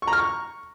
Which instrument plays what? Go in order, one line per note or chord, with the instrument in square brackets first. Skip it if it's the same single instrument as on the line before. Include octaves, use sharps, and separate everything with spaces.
[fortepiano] C#6
A#5
F6
C#6